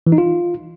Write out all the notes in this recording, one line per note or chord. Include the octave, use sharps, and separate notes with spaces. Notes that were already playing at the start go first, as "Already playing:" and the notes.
E3
D#4
F4